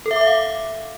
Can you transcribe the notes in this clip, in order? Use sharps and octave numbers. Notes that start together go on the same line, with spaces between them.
A4
E5
D6
E5
F5